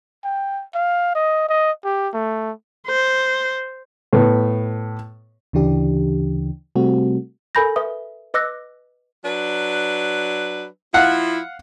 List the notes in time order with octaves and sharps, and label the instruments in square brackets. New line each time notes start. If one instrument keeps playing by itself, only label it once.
[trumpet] G5
F5
D#5
D#5
G4
A3
[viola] C5
[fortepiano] A2 B3
[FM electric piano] D2 C#3 E3 D4 G4
C3 G3 A3 C4 F#4
[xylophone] A4 A#4 G#5 B5 G6 A#6
B4 E5 D#6
B4 D#5 D6 E6 F#6 A#6
[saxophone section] F#3 D4 B4
[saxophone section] F3 E4 [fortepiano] F5 F#5